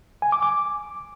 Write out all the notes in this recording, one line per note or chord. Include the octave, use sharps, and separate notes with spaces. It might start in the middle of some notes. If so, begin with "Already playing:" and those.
G#5
D6
D6